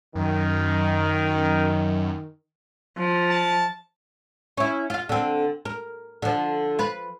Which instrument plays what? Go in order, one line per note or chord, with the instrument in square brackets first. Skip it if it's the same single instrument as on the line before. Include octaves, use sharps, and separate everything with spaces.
[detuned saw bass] F#2 [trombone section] D#3
[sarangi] F3
[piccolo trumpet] A5
[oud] C#4 E4
F4 F5
D3 C4
A#4
D3 F3
F4 B4